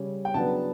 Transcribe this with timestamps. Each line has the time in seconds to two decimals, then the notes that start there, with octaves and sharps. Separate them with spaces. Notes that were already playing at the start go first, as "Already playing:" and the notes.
Already playing: C#3 G3 C#4
0.25 G5
0.34 C#3 F#3 B3 D4 A5